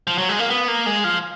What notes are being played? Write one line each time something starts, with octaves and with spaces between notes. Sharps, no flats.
F3
F#3
G#3
A#3
B3
A#3
G#3
F3